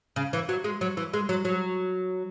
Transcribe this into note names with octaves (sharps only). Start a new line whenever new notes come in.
C#3
E3
F#3
G#3
F#3
E3
G#3
F#3
F#3